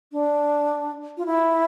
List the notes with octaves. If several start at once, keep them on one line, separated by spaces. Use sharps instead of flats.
D4
F4
E4